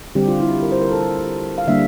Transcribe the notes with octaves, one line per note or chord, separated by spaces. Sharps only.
D3 G3 C4 G4
F4
E4
A#4
C5
A#4
A4
F5
D3 G3 A#3 D4 E5